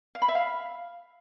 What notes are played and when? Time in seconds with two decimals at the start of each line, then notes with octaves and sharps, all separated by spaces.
0.15 F5
0.22 B5
0.28 E5
0.35 F5